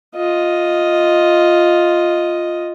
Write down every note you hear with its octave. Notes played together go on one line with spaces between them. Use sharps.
F4 D#5